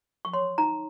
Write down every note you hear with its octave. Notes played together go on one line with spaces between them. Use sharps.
C#6
C#5 C6
D#4 A#5